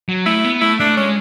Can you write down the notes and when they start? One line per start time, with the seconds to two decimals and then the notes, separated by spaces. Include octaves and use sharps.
0.09 F#3
0.26 A3 E4
0.44 B3
0.61 A3 E4
0.80 A3 D4
0.97 G#3 C#4